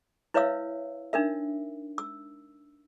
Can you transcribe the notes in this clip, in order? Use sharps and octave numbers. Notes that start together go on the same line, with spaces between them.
E4 B4 C#5 E5 F5 E6
D4 D#4 A#4 E5
E6